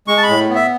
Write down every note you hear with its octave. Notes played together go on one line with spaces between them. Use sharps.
G#3 C#6
A5
B5
A2
B3
E5